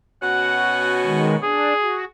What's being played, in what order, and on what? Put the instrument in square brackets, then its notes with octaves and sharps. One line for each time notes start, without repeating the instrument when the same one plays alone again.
[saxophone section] B2 C#4 F#4 [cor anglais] F#5
[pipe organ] D#3 G#3
[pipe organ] D4 [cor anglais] G#4
[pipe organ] F#4